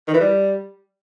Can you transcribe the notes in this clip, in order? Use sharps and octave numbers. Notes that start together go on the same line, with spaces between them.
D#3
E3
G3